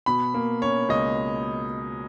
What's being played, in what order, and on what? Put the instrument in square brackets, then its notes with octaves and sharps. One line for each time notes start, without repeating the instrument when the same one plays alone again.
[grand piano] B2 B5
A#3
C#4 C#5
C#2 D#5